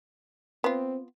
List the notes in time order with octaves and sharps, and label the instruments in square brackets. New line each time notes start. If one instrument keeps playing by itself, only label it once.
[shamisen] B3 F4 [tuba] C4